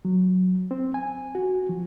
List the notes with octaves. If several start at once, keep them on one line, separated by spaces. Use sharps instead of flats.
F#3
C4
G#5
F#4
F3